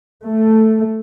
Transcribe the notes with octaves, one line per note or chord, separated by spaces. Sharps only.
A3